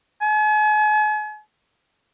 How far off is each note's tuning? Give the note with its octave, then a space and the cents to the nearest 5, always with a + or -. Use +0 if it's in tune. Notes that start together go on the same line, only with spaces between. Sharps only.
G#5 +40